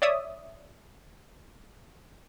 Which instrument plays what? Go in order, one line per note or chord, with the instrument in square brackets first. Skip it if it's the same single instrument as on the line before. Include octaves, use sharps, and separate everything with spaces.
[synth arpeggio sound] C#5 D5 E5 D#6